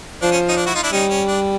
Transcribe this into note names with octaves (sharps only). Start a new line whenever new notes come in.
F3 D4
C#4
C#4 D#4
D4
E4 F#4
D#4 F4
D4 E4
G3 C#4 D#4
C#4
D4